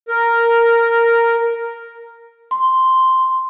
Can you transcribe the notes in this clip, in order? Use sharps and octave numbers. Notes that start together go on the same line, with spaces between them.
A#4
C6